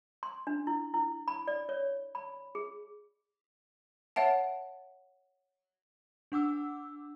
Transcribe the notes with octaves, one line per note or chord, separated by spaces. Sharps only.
C6
D4
E4
E4
B5
D5
C#5
B5
G#4
C#5 E5 F#5 A5
D4 F#5 D6 E6